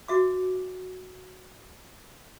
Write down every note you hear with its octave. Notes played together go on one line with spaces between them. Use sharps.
F#4 E5 D6